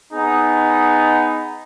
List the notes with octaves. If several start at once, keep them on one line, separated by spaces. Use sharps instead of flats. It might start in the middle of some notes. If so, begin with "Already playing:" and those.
B3 D#4 G#4